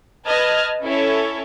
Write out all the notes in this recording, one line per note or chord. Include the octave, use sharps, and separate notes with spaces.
B4 D#5 A5 F6 G#6
C#4 E4 A4 C#5